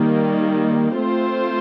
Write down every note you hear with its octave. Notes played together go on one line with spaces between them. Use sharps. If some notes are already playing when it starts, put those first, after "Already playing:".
Already playing: D#3 G3 A#3
A3 C4 F4 C5